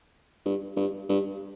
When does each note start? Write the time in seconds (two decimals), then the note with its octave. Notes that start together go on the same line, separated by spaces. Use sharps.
0.46 G2
0.77 G2
1.09 G2